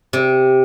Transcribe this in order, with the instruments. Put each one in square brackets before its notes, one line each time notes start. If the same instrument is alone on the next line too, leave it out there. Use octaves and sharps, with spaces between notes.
[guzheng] C3